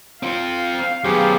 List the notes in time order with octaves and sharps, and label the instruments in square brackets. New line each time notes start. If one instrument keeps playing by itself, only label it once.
[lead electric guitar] C4 F4 [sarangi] F5
[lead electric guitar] F#2 B3 [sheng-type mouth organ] G4 G#4 C5